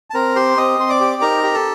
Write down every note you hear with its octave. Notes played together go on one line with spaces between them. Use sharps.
A5
C4 A#4 A#5
G4 C5 C6
C4 D#5 D#6
C4 C6
D5 D6
G4
D#4 A#4 A#5
G4
A4 A5